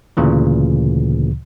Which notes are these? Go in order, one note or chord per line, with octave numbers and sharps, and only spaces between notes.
D2 A#2 C#3 E3